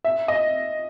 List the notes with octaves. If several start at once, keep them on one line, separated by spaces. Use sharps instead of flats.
E5
D#5